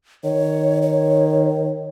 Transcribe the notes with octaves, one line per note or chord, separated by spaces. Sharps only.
D#3 C#5
C#5